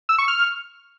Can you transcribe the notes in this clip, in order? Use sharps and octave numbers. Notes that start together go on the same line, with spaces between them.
E6
C#6
F6